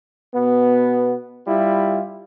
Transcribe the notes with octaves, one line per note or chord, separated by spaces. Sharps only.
B2 B3
G3 E4 F4